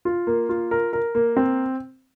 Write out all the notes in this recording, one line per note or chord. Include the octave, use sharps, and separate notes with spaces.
F4
A#3
F4
A#4
A#4
A#3
C4